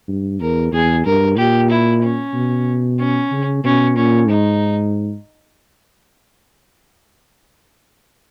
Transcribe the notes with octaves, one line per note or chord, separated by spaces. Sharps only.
G2
E2 A#4
E2 G#4
G2 A#4
A#2 G4
E4
C#4
B2
C#4
C#3
B2 C#4
A#2 C#4
G#2 D#4